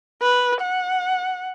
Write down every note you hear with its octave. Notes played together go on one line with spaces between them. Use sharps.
B4
F#5